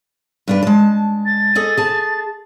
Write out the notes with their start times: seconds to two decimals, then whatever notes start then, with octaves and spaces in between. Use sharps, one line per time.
0.48 G2 D4 B4
0.63 G#3 A5
1.26 A6
1.55 G#4 A4 D#5
1.77 G#4 A5